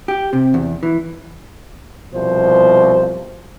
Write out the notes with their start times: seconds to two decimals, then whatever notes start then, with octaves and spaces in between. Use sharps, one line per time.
0.08 G4
0.33 C3
0.54 E2
0.83 E3
2.14 C2 B2 F3 C5